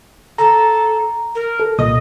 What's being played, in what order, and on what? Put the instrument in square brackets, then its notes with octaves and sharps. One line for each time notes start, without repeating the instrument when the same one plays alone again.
[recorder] A4 [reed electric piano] A#5
[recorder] A#4
[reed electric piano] A4
[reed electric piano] C2 A#2 D#6 [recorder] D#5